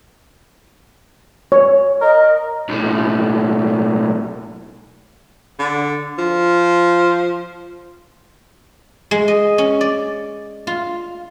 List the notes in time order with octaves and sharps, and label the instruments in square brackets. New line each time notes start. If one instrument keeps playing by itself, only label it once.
[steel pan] C#5
[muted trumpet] A#4 [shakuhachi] D#5
[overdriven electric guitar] B1 A2
[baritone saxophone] D3
F3
[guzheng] G#3
D#5
C#4
D5
F4